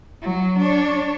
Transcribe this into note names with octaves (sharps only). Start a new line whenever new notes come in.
F#3
D4 C#5